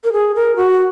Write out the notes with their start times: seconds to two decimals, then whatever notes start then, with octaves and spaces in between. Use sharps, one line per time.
0.04 A#4
0.12 G#4
0.35 A#4
0.56 F#4